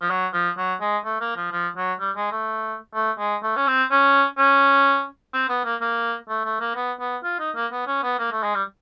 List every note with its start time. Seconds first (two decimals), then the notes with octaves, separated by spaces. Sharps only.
0.01 F3
0.10 F#3
0.33 F3
0.57 F#3
0.81 G#3
1.05 A3
1.20 A#3
1.36 F3
1.52 F3
1.77 F#3
2.00 G3
2.16 G#3
2.32 A3
2.95 A3
3.19 G#3
3.43 A3
3.56 C#4
3.67 C4
3.91 C#4
4.38 C#4
5.34 C4
5.49 B3
5.65 A#3
5.81 A#3
6.29 A3
6.45 A3
6.60 A#3
6.76 B3
7.00 B3
7.24 F4
7.40 D#4
7.56 A#3
7.72 B3
7.87 C#4
8.03 B3
8.19 A#3
8.32 A3
8.43 G#3
8.54 G3